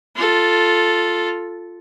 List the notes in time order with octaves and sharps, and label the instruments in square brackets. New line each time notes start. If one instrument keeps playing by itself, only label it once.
[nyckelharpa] F4 A4